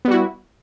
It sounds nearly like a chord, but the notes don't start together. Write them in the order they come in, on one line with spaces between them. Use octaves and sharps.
B3 G3 F#4 E4